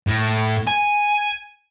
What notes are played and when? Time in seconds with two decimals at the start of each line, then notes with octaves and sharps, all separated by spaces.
0.07 A2
0.67 G#5